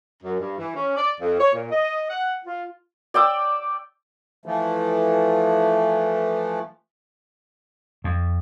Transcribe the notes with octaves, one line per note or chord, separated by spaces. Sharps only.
F#2
G2
E3
C#4
D5
F2
C#5
A#2
D#5
F#5
F4
D5 G5 D6 E6
E3 F3 A3
F2